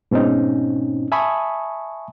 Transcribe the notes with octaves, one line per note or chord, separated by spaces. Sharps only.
G#2 B2 C4 C#4 D#4
E5 G#5 A5 B5 C#6 D#6